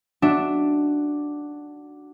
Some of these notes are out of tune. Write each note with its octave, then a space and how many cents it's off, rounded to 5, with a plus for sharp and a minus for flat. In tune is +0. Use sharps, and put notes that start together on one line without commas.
D4 +0 F#4 +0 E5 +0